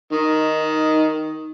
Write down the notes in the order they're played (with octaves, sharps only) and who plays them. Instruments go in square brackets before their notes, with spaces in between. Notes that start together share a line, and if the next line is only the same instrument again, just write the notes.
[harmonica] D#3 [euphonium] D#4